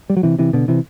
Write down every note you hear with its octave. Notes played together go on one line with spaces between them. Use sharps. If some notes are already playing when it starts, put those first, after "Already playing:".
G3
F#3
C3 E3
C3 E3
B2 D3
C3 E3